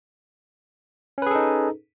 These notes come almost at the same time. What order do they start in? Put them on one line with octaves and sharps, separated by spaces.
C#4 B4 G#4 A4 D#4